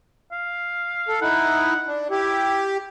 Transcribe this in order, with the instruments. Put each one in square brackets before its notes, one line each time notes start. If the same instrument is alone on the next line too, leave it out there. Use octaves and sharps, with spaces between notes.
[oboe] F5
[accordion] A4
[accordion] D#4 E4 [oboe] F#5
[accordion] D4
[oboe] E4 [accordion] G4